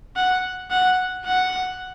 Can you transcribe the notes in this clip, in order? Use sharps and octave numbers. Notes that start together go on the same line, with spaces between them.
F#5
F#5
F#5